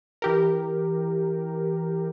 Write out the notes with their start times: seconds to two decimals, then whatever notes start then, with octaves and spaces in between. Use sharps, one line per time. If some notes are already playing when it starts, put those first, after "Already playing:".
0.22 E3 G4 A#4